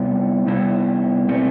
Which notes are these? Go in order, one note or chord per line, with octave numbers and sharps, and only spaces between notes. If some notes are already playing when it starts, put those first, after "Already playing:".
Already playing: C3 G3 B3 E4
C3 G3 B3 E4
B2 A3 C4